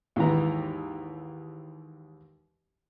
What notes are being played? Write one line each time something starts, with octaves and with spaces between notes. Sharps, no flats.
D#2 G#2 E3 B4 A#5